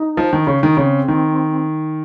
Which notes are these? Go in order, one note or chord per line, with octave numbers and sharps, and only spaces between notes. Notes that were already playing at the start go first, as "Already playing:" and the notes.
Already playing: D#4
F3
D#3
C#3
D#3
C#3 C4
D#3